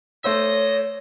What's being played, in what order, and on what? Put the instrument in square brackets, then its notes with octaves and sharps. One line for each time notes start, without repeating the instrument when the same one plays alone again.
[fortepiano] A3 C5 E6 [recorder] C#5 [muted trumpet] D#5